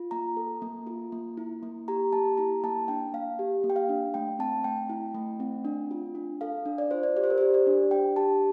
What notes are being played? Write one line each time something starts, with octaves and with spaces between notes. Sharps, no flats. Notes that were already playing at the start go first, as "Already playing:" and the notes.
Already playing: F4
A#3 A#5
A4
A#3
F4
A#3
E4
A#3
G4 A#5
A#3 A5
E4 A#5
A#3 A5
D4 G5
A#3 F5
G4
A#3
G5
F5
D4
A3 G5
C4 A5
A3 G5
E4
A3
C4
D4
F4
D4
A4 F5
D4
D5
F4 C5
D5
G4 D5
C5
A#4
G4 C5
D5
D4
D4 G5
G4 A5